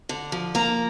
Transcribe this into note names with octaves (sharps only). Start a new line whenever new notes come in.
D3
F3
A#3 A#5